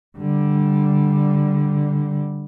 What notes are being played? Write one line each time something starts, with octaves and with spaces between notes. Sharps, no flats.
D3 G3